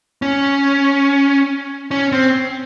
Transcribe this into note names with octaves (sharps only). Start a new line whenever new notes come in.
C#4
C#4
C4